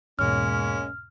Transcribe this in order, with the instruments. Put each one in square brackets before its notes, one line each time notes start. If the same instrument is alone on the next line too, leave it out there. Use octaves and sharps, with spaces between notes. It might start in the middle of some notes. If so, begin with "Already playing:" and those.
[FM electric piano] E2 G#2 B2 [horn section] G#3 A#3 C#4 [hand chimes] F6